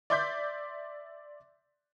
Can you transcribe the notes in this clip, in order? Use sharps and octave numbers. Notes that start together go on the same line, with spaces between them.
D5 E5 C6 D6 G6 B6